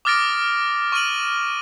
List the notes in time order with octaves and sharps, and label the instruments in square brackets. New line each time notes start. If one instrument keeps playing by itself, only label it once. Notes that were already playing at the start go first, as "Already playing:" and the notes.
[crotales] D6 D#6 F6 A6 A#6 D7
C#6 F6 D#7 F#7